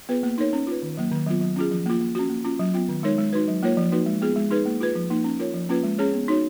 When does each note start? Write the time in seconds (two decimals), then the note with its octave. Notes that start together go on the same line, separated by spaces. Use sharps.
0.09 B3 F4 G#4 B4
0.23 A#3
0.38 D#4 A#4 C#5
0.53 C#4
0.67 F4 B4
0.83 D#3
0.97 F#3 A#3
1.11 D#3
1.26 F#3 B3 F4
1.41 F#3
1.56 C#4 F4 G#4
1.71 F3
1.86 A#3 F4
2.01 A#3
2.15 C#4 F#4
2.30 A#3
2.44 C#4 F4
2.59 F#3
2.74 B3 F4
2.89 D#3
3.03 G#3 D#4 A#4 C#5
3.18 G#3
3.33 D#4 F#4 B4
3.48 F#3
3.63 A#3 F4 A#4 C#5
3.77 F3
3.92 A#3 D#4 F#4 B4
4.06 G#3
4.22 B3 F4 G#4
4.36 G#3
4.51 D#4 G#4 B4
4.66 A#3
4.81 F4 G#4 B4
4.95 F3
5.10 A#3 D#4
5.24 C#4
5.39 F4 A#4 C#5
5.54 F3
5.69 A#3 C#4 F4 B4
5.83 G#3
5.98 C#4 G#4 C#5
6.14 B3
6.28 D#4 F#4 C#5